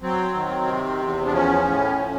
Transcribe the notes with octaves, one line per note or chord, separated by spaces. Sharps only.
F#3 C4
D#3
C3
E2
D4
F3 C#4
A2
F3